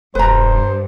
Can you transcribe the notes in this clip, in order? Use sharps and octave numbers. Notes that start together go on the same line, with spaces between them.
E1 G2 B4 C5 A#5